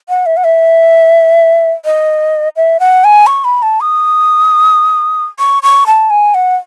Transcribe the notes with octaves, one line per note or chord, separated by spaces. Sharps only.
F#5
E5
F#5
E5
D#5
E5
F#5
G#5
C#6
B5
A5
D#6
C#6
C#6
A5
G#5
F#5